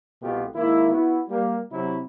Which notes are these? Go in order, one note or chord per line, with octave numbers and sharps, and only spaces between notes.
C2 B2 A3 B3 F4 G4
G#2 D#3 A#3 E4
B3 E4 F#4
G3 A#3
C3 F#3 E4